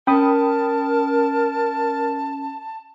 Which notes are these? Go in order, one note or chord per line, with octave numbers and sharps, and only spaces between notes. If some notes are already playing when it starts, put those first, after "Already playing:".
C#4 A#4 G5 A5 B5 D#6